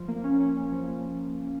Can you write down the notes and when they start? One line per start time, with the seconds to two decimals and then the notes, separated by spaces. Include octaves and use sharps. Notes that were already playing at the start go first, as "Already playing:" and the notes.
Already playing: F3
0.08 A#3
0.24 C#4
0.40 C#4
0.57 C#4
0.72 F3